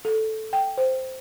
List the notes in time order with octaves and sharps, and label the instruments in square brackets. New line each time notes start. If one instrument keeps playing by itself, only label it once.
[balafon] A4
G5
C5